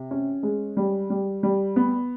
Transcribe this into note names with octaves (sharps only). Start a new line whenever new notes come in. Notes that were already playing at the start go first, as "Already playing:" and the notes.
Already playing: C3
C#4
G#3
G3
G3
G3
B3